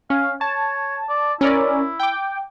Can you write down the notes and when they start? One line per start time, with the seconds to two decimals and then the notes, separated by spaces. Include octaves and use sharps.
0.10 C#4 F5
0.41 C#5 A5
1.09 D5
1.41 C#4 E4 A#4 D5
2.00 G5 D6